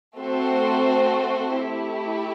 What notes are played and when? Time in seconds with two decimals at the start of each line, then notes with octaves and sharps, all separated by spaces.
0.16 A3 C4 F#4 A4 C5
1.55 A3 E4 G4